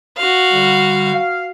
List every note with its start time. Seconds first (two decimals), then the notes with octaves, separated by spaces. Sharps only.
0.17 F#4 F5
0.52 D3 G3
1.14 F5